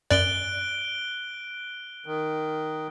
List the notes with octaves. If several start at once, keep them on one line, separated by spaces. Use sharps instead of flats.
F#2 D5 F#6 D7 G7
D#3